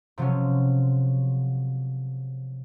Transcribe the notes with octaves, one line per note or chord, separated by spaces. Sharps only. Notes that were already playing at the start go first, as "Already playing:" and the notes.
C3 F3 F#3 G#3 C#4